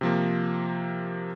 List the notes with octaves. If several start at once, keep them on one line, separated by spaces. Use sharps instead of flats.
C3 F3 A#3